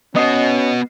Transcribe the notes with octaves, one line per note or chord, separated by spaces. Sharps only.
B3 C#4 F#4 D#5 D#6 C7